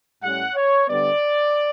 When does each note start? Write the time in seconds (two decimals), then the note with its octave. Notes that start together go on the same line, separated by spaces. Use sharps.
0.22 A2 G3 C#4 F#5
0.55 C#5
0.87 D3 G3 B3 D5